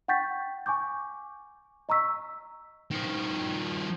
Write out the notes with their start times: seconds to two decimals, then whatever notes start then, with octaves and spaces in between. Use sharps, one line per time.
0.08 F#5 G5 C#6 G6 A6 B6
0.66 G#5 C#6 D6 G6
1.89 D#5 A#5 C#6 E6 B6
2.91 D#3 F3